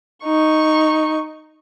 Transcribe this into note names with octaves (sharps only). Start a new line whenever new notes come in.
D#4 C#6